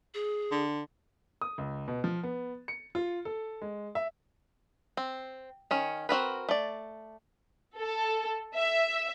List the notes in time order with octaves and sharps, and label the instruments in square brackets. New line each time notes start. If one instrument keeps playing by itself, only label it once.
[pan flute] G#4
[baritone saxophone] D3
[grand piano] D#6
C#2
B2
F3
B3
C#7
F4
A4
G#3
E5
[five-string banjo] C4
D#3 C#4
C4 F#4 A#4 B4
A3 D5
[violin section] A4
E5